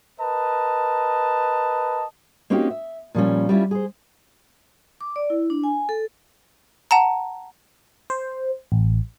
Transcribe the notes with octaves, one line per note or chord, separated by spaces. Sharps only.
A#4 B4 D#5 A5
A#3 C4 C#4 D#4 F#4 G4
E5
A#2 F3 G3 C#4
G3 C#4 E4 F4
G#4 C5
D6
D5
E4
D4
G#5
A4
F#5 A5 A#5
C5
A1